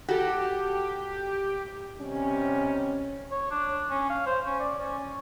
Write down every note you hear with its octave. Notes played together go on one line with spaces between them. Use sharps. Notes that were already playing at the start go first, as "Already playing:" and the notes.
F#4 G4 A4
C3 D#3 G3 C#4
C#5
D4
C#4
F5
C5
C#4
D5
C#4